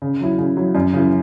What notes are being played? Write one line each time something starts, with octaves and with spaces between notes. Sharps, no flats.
C#3
F#3 E4
C#3
F#3 E4
F#2
C#3 E3